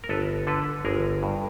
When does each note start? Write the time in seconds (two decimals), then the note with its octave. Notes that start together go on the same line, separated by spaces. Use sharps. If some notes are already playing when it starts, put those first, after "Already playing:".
0.04 A#4
0.09 G1 A4 B4
0.47 D3 A4 B4
0.85 G1 G#4 A#4
1.23 G2